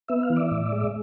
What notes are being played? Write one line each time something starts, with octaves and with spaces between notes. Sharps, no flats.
B3 E5
F5
E3
D5 E5
A2
G#3